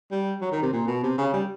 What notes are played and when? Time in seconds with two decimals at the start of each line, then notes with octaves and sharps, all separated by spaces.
0.11 G3
0.42 F#3
0.52 D#3
0.62 C3
0.73 A#2
0.88 B2
1.03 C3
1.18 C#3
1.33 G3